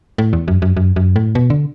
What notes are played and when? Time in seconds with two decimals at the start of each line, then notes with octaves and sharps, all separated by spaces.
0.18 A2
0.33 E2
0.48 F#2
0.62 F#2
0.77 F#2
0.96 F#2
1.16 A2
1.35 B2
1.50 D3